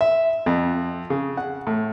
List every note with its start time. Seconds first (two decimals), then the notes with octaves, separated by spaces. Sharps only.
0.01 E5
0.46 F2
1.10 C#3
1.37 F#5
1.67 A2